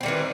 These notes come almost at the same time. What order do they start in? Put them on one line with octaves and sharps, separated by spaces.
C4 G3 D#3 E3